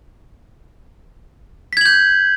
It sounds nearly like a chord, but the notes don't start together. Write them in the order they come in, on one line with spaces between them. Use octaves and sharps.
B6 G#6 F#7 G6